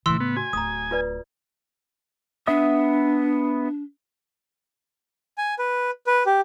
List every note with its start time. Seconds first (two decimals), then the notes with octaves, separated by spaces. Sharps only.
0.06 A2 C#3 E3 C6 E6
0.20 B3
0.37 F#4 G#5
0.53 D1 A#5 D#6
0.91 F4 B4 D5
2.47 B3 D4 E5 D#6
5.38 G#5
5.59 B4
6.07 B4
6.26 G4